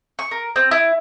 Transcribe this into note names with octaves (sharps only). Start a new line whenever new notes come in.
C#6
A#4
C4
E4